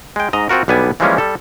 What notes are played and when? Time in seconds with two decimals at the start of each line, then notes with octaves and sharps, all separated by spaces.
0.16 G#3 G5
0.33 G#2 D#5 A#5
0.49 C4 F4 F#4 A#4
0.68 B1 G3 B3 D4 G#5
1.00 E3 F3 G3 G#3 A#3 C#4
1.18 G3 A4